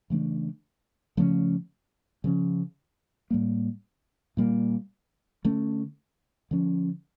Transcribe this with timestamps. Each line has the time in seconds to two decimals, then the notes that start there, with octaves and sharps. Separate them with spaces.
0.10 C#3 E3 A3 D4
1.17 C#3 F3 A3 C#4
2.24 C#3 F3 C#4
3.30 A2 G3 A#3
4.37 A#2 G3 A#3
5.45 D3 A3 C#4
6.51 D3 F3 C#4